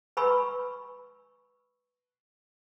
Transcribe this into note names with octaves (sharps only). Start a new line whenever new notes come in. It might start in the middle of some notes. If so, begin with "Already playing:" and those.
B4 G#5 B5 C#6 E6